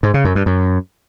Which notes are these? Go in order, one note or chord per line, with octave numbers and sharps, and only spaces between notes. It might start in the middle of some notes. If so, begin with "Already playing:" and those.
G#2
C#3
F#2
G2
F#2